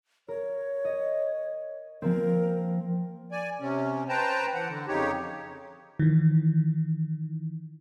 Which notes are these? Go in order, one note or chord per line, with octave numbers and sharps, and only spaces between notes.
A#4 C#5
D#5
F3 A#3 C4 A#4
D5 G#5
C3 C#4
B4 C5 G5 A5 A#5
E3 F#5
D3
F2 C#3 D#4 G4 C#5
D#3 E3